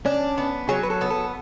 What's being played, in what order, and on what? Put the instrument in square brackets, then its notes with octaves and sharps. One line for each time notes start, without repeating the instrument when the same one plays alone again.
[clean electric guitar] C#4 [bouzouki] D4
[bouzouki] B3
[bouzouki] F#3 [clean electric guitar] G#4
[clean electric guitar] B4
A4
[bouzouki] B3
[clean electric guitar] A4